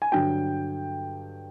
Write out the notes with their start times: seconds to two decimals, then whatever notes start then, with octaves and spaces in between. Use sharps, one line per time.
0.02 G#5
0.12 G2 D3 F#3 G5